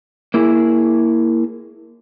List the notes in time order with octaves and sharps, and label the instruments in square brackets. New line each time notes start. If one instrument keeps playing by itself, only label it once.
[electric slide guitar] A#3 E4 G#4